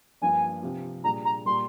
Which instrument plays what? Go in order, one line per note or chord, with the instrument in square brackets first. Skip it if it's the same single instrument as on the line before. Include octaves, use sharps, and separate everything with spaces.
[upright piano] G2 F3 A#3 D4 [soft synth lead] G#5
[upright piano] C3 F3 C4 G4
[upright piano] A#2 G3 D4 F4 G#4 [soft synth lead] A#5
[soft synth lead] A#5
[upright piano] A#2 G3 A#3 [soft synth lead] C6